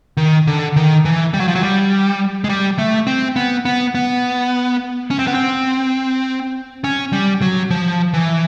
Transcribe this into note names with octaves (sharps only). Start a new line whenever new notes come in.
D#3
D3
D#3
E3
G3
F#3
F3
F#3
G3
G#3
G3
A3
C4
B3
B3
B3
C#4
C4
B3
C4
C#4
G3
F#3
F3
E3